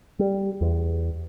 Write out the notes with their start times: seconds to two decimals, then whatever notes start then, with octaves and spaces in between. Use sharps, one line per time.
0.19 G3
0.61 E2